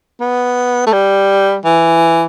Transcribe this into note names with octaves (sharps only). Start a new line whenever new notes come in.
B3
A3
G3
E3